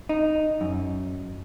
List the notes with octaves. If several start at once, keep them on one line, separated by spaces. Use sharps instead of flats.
D#4
F#2